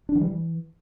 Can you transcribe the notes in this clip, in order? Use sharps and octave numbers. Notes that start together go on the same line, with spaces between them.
D4
E3
G3
E3